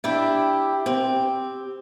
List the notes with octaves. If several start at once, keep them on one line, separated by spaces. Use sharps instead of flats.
D4 E4 G4
C4 G4